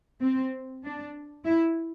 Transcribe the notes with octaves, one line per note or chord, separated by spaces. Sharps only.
C4
D4
E4